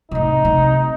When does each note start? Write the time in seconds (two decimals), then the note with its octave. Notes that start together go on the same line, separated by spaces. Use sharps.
0.11 A2 C3 D#4
0.45 C3